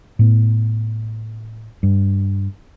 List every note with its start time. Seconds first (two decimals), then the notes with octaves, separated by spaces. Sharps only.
0.19 A2 B3
1.83 G2